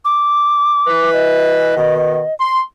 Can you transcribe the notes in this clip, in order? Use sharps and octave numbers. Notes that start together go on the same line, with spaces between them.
D6
E3 B4
D#5
B2 D#3
C6